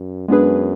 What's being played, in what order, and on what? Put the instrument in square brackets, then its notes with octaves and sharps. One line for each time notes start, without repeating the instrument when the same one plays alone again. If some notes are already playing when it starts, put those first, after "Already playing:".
Already playing: [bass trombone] F#2
[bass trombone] F#2 [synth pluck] G#3 B3 D4 G#4 B4